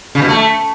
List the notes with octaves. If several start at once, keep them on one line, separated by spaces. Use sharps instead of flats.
C#3
B2
A3